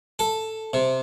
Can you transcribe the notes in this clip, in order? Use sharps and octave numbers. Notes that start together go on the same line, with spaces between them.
A4
C3